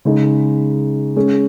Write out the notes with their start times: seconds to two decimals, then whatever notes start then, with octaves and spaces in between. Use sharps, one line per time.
0.05 C#3 G#3 D#4
1.16 G#3 C#4 G#4